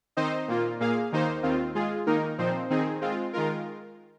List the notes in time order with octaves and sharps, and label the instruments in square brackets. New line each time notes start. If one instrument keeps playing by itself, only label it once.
[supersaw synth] D#3 C4 D#4 C5 D#5
A#2 A#3 F4
A#2 A#3 G#4 F5
D#2 D#3 A#3 D#4 C5
D#2 D#3 C4 F4
G#3 F4 G#4
D#3 A#3 D#4 A#4
A#2 F3 C4 D#4 C5
D#3 C4 D#4 G#4
G#3 C4 F4
D#3 G#3 F4 A#4